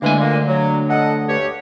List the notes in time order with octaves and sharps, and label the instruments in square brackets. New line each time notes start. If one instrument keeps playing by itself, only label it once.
[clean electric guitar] D2 D3 G#5 [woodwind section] E3 G#3 A#3
[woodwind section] A#2 G#3 A#3
F#3
A4 D#5 F#5
G2 G4 C#5